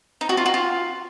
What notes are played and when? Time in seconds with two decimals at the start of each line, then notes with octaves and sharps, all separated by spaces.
0.21 D#4
0.29 F#4
0.37 F4
0.46 F#4
0.54 F4